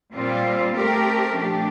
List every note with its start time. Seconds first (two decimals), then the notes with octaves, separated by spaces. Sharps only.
0.13 A#2 G3 C4 F4
0.75 A3 C4 G4 A#4
1.37 A#2 F3 A3 D4 G4